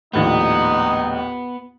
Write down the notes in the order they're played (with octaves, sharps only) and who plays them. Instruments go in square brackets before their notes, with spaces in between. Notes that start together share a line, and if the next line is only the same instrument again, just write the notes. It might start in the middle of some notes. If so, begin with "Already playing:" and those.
[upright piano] A#1 D#2 A2 [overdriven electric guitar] B3 [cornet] D#4